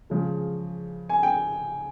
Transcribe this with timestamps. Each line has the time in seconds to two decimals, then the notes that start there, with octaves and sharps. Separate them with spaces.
0.10 C#3 F3 G#3
1.09 G#5
1.23 G5